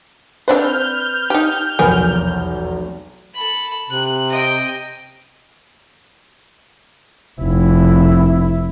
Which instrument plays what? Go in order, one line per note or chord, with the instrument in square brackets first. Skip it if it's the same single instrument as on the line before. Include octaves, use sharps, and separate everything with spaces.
[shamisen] C4 D4 C5 [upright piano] B4 [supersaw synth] F6 G6
[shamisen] D#4 G4
[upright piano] F1 B1 E2 [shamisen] B3 A#4 G#5
[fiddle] A4 B5
[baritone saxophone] C3 [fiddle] F#6
[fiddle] D#5 G5
[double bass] F1 E4